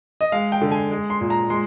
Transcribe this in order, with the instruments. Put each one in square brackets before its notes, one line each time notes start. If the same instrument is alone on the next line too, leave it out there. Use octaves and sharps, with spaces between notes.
[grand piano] D#5
G#3 F5
G5
D3
G#5
G#3
C6
A#2
A#5
G#3 C6